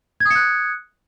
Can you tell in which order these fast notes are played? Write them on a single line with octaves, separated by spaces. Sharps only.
G#6 D#6 C#7 F#6